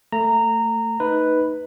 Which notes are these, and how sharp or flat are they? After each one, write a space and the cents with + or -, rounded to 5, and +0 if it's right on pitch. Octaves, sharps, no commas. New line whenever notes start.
A3 +25 A#5 -15
D#4 +0 B4 +0 D#5 +15